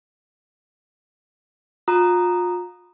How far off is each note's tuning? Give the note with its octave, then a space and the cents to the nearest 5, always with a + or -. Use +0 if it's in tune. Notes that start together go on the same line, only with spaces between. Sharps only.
F4 +30 A#5 +0 D#6 -15